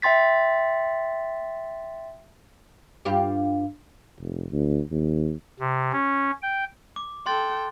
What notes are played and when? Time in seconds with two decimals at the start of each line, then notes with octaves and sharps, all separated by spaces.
0.02 E5 G5 C6 A6 B6
3.05 G2 F4 G4
4.20 F1
4.52 D2
4.91 D#2
5.60 C3
5.92 C#4
6.42 G5
6.96 D6
7.26 A4 G5 C6 F#6 A6